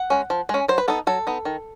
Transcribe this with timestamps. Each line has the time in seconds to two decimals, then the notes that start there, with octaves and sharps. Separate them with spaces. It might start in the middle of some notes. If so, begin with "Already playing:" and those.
Already playing: F#5
0.10 G#3 C#4
0.30 F3
0.49 G#3 C#4
0.68 F#3 C5
0.78 B4
0.88 B3 D#4 A4
1.07 F#3 A4
1.27 B3 D#4
1.45 D#3